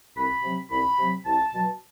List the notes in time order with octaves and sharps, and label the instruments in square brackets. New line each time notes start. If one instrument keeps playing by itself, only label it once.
[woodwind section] C2 B5
C3 F#3
C2 B5
C3 F#3
C2 A5
B2 F#3